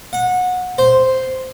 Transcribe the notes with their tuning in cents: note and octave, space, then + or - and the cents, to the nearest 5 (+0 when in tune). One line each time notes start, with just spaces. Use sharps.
F#5 -25
C5 -5